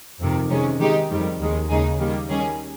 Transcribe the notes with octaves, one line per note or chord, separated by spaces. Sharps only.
F2 C3 D#3
C3 D#3 G#3 C#4
D#3 G#3 D#4 G4
F2 D#3 G3
D#2 D#3 G#3
D#2 C#3 G#3 D#4 G#4
D#3 G3 A#3
D#3 G3 C#4 G#4